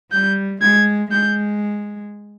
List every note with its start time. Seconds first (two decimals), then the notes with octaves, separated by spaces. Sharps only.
0.12 G3 G6
0.61 G#3 G#6
1.11 G#3 G6